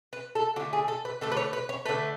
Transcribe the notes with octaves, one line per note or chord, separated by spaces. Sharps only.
B4
A4
D3 A3 F#4
G#4
A4
B4
D3 A3 A4
B4
C#5
B4
C#5
D3 A3 B4